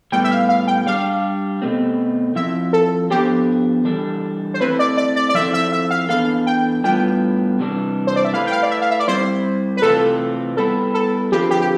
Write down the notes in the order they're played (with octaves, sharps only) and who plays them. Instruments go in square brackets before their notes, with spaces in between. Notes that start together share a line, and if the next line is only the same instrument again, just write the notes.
[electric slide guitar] A2 G3 B3 [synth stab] G5
[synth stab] E5
F5
F5
G5
[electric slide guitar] G3 D4 G4 [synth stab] F5
[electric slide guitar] B2 A3 C4
[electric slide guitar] F3 C4 E4 [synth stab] E5
[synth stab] A4
[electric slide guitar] F3 B3 D4 A4 C5 [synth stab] G4
[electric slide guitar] E3 G3 D4 A4
[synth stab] C5
[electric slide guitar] A3 C4 E4 [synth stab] B4
[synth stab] D5
D5
D5
D5
[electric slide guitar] F3 C4 E4 A4 C5 [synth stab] E5
[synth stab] E5
E5
F5
[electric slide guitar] E3 B3 D4 A4 [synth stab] F5
[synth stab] G5
[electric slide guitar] A2 G3 B3 D4 F4 [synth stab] G5
[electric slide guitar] C3 E3 G3 D4
[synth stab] C5
D5
E5
[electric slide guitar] A3 E4 B4 [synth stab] F5
[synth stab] G5
F5
D5
E5
F5
E5
D5
[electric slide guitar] G3 C4 E4 [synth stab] C5
[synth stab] B4
[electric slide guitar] C3 E3 A3 C4 F4 [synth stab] A4
[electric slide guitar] G3 B3 E4 [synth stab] A4
[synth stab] A4
[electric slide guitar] D3 F3 C4 F4 B4 [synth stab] G4
[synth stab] G4
G4